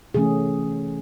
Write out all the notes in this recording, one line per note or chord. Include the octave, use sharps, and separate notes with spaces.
C3 E3 A3 C#4 G#4